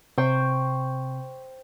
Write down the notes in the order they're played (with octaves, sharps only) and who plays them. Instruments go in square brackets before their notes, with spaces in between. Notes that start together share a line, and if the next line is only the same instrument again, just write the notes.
[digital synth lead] C3 [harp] C5 G5 C#6